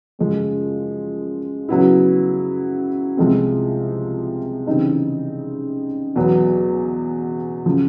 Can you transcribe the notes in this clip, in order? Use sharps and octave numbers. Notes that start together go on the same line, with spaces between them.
F#2 C#3 F3 G#3
C#3 F#3 B3 E4
C2 C3 F3 G#3 C4
C#3 E3 G3 C4 D#4
E2 B2 F#3 B3
C#3 F3